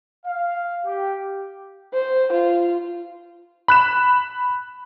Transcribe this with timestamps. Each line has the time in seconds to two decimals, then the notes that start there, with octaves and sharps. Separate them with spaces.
0.26 F5
0.85 G4
1.93 C5
2.32 F4
3.68 B5 F#6 E7